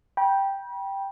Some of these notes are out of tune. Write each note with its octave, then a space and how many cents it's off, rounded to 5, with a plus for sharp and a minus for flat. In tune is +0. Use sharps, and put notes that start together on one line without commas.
G5 +0 B5 -35